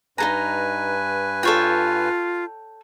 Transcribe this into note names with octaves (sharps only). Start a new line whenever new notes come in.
G2 D#4 A4 B4 G#5 A#5
F4 A4 C#5 G5